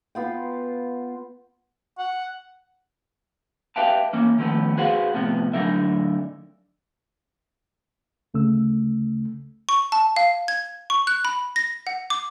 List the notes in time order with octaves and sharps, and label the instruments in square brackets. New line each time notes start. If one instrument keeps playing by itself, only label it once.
[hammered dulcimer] B3 F4 G5
[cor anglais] F#5
[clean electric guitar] G4 B4 E5 F5 G5 A5
E3 A#3 C#4
D#3 F3 A3 B3 C#4
F#4 G#4 B4 C5 F5 F#5
A2 C3 F3 B3
A2 D3 F#3 D#4 A#4 E5
[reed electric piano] D2 C#3 A3 E6
[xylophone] C#6
A5
F5
G#6
C#6
F#6
B5
A#6
F#5
D6